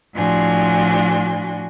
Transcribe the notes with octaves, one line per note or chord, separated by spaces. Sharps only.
A2 F3 D4 F#4 G#5 C6